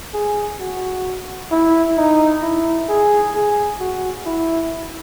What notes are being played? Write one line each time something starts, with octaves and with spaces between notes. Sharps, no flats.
G#4
F#4
E4
D#4
E4
G#4
G#4
F#4
E4